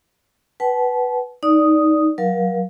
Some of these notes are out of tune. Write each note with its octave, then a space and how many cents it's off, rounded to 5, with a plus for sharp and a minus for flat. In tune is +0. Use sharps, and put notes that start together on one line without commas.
B4 +0 F#5 +45 A5 -40
D#4 +10 D5 -5 D#6 +0
F#3 +5 A#4 +35 F5 +0